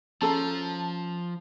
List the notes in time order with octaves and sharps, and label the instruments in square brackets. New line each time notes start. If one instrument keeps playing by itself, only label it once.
[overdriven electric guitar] F3 [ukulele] C#4 A4 A#5 [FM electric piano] A5